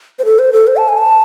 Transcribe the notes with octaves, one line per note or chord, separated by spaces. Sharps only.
C5
A4
C5
A4
C5
A5
G#5
A5